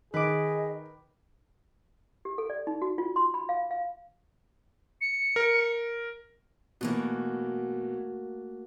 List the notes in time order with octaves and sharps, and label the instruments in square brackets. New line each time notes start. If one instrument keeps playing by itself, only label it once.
[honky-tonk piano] D#3 [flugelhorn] G#4 [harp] B4 D6 [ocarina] D#5
[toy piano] G4
A4
D5
D#4
F#4
F4
C6
B5
F5
F5
[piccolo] C#7
[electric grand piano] A#4
[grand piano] B2 E3 [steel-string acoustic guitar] A3 A#3 F#4